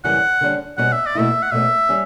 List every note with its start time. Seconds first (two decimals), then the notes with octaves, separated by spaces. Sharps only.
0.04 F#2 C#3 E3 G3 F#5
0.41 D3 G3 C#4
0.77 B2 G3 C#4 F#4 F#5
0.92 E5
1.06 D5
1.15 B2 A3 E4 E5
1.43 F#5
1.51 B2 A3 C#4 E5
1.89 G3 C#4